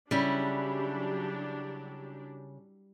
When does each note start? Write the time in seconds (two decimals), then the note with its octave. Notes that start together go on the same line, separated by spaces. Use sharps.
0.11 C#3 F#3 G3 D4 E4 G4